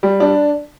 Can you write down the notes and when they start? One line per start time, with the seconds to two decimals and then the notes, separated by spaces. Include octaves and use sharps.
0.03 G3
0.20 D4